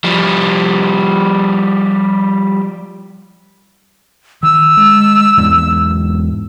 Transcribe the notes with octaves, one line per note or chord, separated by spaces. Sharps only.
F3 G3
D#3 E6
G#3
E2 G#2 B3